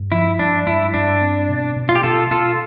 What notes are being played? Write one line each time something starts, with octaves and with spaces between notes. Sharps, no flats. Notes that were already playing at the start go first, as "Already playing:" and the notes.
Already playing: G2
F3 E4
G2 D4
G2 E4
G2 D4
C4
B2
B2
F4
G4
B2 F4 A4
B2 F4 A4